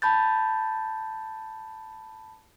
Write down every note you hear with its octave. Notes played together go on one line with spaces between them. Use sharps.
A5 B5 G6 A6